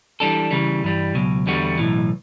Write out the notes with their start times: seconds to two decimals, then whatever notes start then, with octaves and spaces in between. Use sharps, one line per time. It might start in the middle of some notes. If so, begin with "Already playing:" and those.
0.20 E3 G3 D4 A4
0.51 C#3 E3 G3
0.84 G2 E3 G3
1.15 C#2 B2 F#3
1.46 E2 D3 G3 B3 F#4
1.78 B1 A2 E3